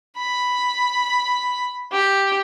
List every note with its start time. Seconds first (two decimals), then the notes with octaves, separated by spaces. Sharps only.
0.18 B5
1.92 G4